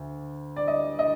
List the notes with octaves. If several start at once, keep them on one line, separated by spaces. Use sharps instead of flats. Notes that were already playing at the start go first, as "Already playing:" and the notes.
Already playing: D2
D5
D#5
D#5